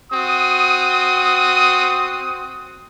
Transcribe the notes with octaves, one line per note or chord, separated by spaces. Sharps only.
C4 F#4 D#6